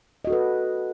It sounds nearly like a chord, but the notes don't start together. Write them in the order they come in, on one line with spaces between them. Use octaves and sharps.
D#5 F#4 A4 B4